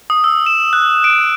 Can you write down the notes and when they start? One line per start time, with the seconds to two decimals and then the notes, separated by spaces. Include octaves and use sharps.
0.10 D#6
0.24 E6
0.46 E7
0.73 F#6
1.04 D7